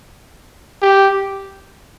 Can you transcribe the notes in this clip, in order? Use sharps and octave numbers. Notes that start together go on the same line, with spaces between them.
G4